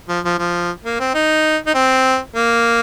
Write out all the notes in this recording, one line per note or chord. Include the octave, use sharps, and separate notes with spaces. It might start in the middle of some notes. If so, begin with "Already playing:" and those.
F3
F3
F3
A#3
C4
D#4
D#4
C4
A#3